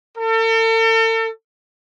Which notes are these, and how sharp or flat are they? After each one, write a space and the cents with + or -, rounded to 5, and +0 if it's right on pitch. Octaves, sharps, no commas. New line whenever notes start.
A4 +40